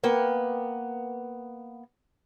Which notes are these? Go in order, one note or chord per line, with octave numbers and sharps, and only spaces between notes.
A#3 B3 G5